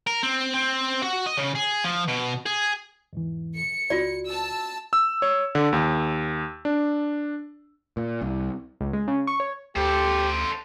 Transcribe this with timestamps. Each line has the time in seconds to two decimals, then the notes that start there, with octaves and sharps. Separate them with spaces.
0.07 A#4
0.23 C4
0.54 C4
1.03 F#4
1.26 D#5
1.38 C#3
1.55 G#4
1.84 F3
2.08 B2
2.46 G#4
3.13 E2 G#2 E3
3.55 C#7
3.90 C#2 F4 F#4 D5
4.28 A5 E6
4.93 E6
5.22 C#5
5.55 D3
5.73 D#2
6.65 D4
7.97 A#2
8.21 C2
8.81 C#2
8.93 G#3
9.08 C#3
9.27 C#6
9.40 C#5
9.76 D2 G4 A4 C5